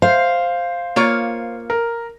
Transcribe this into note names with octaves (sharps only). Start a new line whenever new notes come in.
C5 F5
A#3 F4 C#5
A#4